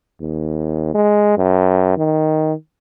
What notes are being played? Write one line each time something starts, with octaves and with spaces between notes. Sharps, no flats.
D#2
G#3
F#2
D#3